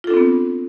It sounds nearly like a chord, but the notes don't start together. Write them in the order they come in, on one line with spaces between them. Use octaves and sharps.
F4 A4 D4 C4 B3